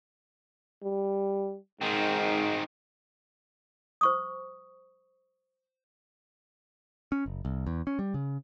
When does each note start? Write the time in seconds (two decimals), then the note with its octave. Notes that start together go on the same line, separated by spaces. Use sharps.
0.83 G3
1.81 G#2 D#3 C4
4.01 C5 C#6 D#6
7.12 C#4
7.26 F#1
7.45 C2
7.67 E2
7.87 C#4
7.99 G3
8.14 C#3